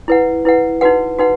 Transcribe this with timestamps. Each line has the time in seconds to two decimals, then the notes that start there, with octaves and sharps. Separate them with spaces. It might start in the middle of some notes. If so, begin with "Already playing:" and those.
0.08 E4 B4 F#5
0.45 E4 B4 F#5
0.81 D#4 F#4 B4 F#5
1.19 D#4 F#4 B4 F#5